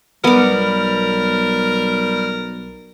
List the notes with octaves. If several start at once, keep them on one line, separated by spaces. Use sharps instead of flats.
B1 G3 B3 A#4 D6